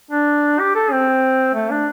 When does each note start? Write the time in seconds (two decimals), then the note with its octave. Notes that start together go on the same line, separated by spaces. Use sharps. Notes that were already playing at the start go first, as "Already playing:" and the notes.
0.11 D4
0.59 G4
0.75 A4
0.91 C4
1.54 A3
1.71 D4